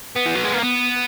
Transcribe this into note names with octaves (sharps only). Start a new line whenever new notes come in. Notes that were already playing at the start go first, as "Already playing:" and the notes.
B3
E3
F#3
G#3
A#3
B3